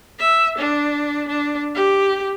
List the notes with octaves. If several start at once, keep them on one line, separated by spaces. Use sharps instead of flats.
E5
D4
D4
G4